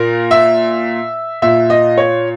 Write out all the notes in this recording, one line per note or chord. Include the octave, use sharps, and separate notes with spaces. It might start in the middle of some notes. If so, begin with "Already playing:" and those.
Already playing: A#2 A#4
E5
A#2 E5
D#5
C#5